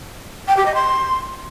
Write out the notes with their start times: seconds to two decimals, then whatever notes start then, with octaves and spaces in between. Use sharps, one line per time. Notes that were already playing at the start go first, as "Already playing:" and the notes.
0.47 G5
0.56 G4
0.65 D#5
0.74 C6